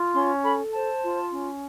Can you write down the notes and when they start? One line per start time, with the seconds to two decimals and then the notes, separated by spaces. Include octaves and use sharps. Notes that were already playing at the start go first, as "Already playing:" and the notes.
Already playing: F4
0.15 C#4 C6
0.43 A4 B5
0.73 C5 A5
1.03 F4
1.32 C#4